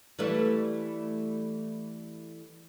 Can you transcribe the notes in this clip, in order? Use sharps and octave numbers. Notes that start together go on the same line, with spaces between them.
E3 G3 A3